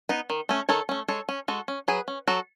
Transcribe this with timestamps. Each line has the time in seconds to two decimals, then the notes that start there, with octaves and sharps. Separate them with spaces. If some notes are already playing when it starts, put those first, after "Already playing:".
0.09 B3 D#4
0.30 D#3
0.49 A3 C#4
0.69 D#3 A4 C#5
0.89 A3 C#4
1.08 G#3 A4 C#5
1.29 C#4
1.48 G#3 F#4 A4
1.68 C#4
1.88 F#3 G#4 B4
2.08 C#4
2.27 F#3 F#4 A4